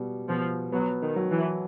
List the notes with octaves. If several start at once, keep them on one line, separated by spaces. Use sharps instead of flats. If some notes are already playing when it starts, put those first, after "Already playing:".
Already playing: B2 G3
B2 F3
F#3 B3
D#3
F#3
E3